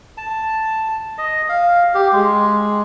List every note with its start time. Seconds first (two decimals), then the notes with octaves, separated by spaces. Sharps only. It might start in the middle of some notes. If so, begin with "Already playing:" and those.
0.18 A5
1.18 D#5
1.49 F5
1.95 G4
2.13 G#3